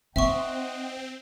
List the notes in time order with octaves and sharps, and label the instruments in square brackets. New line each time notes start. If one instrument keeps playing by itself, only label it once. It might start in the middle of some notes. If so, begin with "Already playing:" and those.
[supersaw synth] C4 [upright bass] D#4 [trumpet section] D#5 F#5 [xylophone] E5 C#6